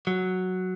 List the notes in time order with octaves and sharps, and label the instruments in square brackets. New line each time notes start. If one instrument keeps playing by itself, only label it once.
[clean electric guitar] F#3